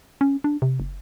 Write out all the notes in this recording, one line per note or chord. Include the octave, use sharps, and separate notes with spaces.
C#4
D4
C3
F#1